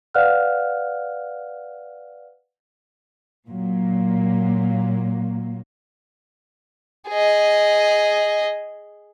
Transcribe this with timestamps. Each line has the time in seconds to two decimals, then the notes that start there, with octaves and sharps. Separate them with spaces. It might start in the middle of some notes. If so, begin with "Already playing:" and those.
0.14 B4 D5 F5 F#5 F6 F#6
3.48 A#2 F#3 A#3
7.09 G#4 D#5